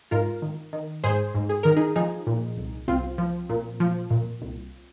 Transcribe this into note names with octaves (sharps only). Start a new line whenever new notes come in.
G#2 F4 A#4
D#3
D#3
G#2 G#4 C5
G#2
G#4
D#3 A#4
D#4 G#4
F3 D#4 G#4
A#2
C2
C2 C4 F4
F3
A#2
F3
A#2
C2